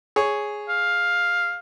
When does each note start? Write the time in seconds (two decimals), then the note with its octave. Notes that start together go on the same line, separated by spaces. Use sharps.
0.16 G#4 C#5
0.69 F5